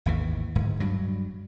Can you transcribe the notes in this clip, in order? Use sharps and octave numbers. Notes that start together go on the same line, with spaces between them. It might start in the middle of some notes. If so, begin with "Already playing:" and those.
G#1 D#2 E3
D1 G#2
G2 F#3